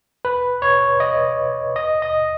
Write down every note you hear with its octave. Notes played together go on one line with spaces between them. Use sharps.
B4
C#5
D#5
D#5
D#5